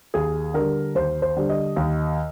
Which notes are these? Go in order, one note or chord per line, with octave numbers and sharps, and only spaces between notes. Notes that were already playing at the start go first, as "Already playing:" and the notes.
D#2 G#4
D3 G3 A#4
D#2 C5
C5
D3 G3
D#5
D#2